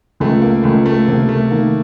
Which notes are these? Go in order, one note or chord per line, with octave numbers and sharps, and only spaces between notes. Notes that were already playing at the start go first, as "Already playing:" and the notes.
C#2 A3
A#3
C#2 A3
A3
C3 A#3
A3
D#3 A#3